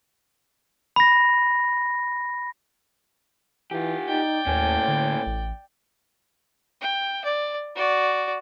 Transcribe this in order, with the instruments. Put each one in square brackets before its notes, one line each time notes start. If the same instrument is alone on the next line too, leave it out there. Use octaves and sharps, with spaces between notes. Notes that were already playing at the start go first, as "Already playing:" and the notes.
[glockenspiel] B5 A#6
[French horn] E3 [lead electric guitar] F4 G4
[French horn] D#4 [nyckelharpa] D5 G5
[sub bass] D#2 [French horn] A2 [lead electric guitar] A#3 C#4
[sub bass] D3
A1
[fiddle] G5
D5
F#4 D5